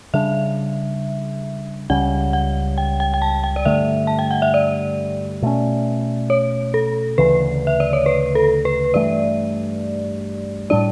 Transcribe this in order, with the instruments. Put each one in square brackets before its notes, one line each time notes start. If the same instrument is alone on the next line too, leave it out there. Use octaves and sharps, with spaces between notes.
[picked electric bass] C#3 G3 D4 [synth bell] E5
[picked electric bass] C#2 C#3 G3 C#4 [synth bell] F#5
[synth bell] F#5
G5
G5
G5
A5
G5
D5
[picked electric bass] G2 D3 A3 [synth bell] E5
[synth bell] A5
G5
F#5
E5
D5
[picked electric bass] B2 A3 C#4
[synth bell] C#5
A4
[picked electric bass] D2 C#3 E3 [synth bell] B4
[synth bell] E5
D5
C#5
B4
A4
B4
[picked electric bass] G2 E3 A3 [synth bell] D5
[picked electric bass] A2 G3 D4 [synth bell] D5